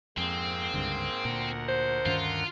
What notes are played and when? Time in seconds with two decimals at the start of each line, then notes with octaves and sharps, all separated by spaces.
0.17 F2 G#2 A#3 C4 G#4
0.74 C#2 G2 D3
1.25 D2 A#2 A#4 F#5
1.69 C5
2.06 G2 D#3 C#4 F4